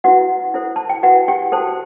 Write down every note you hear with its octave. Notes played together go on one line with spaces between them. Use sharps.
E4 F#4 B4 F#5
E4 A4 C5
A5
G5
E4 F#4 B4 F#5
G4 G5
F#4 A4 C5 A5